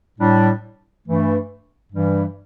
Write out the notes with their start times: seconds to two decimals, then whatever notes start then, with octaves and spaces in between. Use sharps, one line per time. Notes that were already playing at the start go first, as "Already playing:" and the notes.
0.19 A2 G3 D4
1.06 G2 E3 A3
1.93 G2 E3 G3